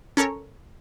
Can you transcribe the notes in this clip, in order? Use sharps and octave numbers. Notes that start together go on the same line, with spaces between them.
C#4 A4 A#4 C#5